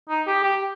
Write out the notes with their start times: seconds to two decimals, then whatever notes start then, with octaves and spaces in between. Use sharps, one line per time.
0.09 D#4
0.27 G4
0.43 G4